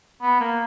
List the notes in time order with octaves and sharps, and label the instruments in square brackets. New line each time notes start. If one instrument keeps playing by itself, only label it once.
[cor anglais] B3
A#3